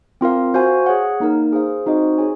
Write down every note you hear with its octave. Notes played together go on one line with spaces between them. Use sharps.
C4 F4 A#4 F5
F#4 C5 F5 G#5
G#4 C#5 F#5
A#3 D#4 A#4
G#4 C5 F5
C4 D#4 F#4 C5 D#5
G#4 C#5 G#5